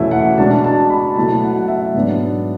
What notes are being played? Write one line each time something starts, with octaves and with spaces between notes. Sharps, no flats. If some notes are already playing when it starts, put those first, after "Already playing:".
Already playing: E2 B2 A3 C#4 E4 E5
F#5
B2 G#3 D4 A5
A5
B5
B2 F#3 A3 E4 A5
F#5
F#5
E5
G#2 F#3 B3 D4